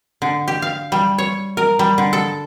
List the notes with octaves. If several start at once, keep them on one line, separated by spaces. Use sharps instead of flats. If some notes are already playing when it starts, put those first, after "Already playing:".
D3
G4
F5
G3
C#5
A#4
G3
D3
A4